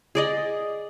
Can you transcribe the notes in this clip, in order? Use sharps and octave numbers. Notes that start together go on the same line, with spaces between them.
G#4 D5 D#5